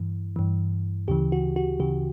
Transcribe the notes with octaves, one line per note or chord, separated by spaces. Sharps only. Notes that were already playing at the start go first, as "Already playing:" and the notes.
Already playing: G2 E3
G2 E3
D2 C#3 E3 G4
F#4
F#4
D2 C#3 E3 G4